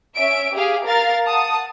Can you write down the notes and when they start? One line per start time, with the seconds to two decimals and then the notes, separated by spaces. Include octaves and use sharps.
0.16 C#4 E5 D7
0.54 G4 G#4 F5
0.87 A#4 F5 A6
1.25 F#5 A5 D#6